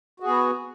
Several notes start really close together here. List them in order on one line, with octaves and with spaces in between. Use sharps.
F#4 G#4 B3